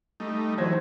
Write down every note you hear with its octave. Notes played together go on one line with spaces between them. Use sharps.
G3 A3 D#4
E3 F#3 C5 G#6 A#6